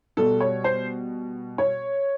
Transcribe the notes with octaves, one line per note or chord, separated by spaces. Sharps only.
B2 G3 A4
C#5
C5
C#5